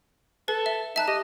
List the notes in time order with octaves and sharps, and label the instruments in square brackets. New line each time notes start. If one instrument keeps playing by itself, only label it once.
[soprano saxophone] A4 [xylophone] B4
[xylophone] E5
[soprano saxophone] D#4 [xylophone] E5 A5 F#6
[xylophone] G4 [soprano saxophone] D#5